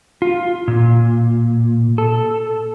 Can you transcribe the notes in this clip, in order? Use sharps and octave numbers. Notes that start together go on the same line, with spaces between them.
F4
A#2
A4